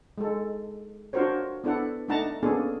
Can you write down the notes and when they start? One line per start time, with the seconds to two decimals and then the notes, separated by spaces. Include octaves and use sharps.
0.18 G#3 A4
1.13 D4 F4 F#4 A#4 C5 C#5
1.64 B3 D4 E4 A4 B4 F#5
2.08 A3 D4 D#4 F#5 A5 A#5
2.43 A#3 B3 C#4 D4 G#4 A4